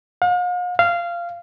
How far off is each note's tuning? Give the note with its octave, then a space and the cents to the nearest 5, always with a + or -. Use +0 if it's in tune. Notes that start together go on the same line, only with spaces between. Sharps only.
F5 +45
F5 -15